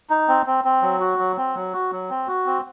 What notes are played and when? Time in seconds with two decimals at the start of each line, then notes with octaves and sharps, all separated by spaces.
0.10 D#4
0.28 C4
0.46 C4
0.65 C4
0.82 F#3
1.00 F#4
1.19 F#3
1.37 C4
1.55 F#3
1.73 F#4
1.92 F#3
2.10 C4
2.28 F#4
2.46 C4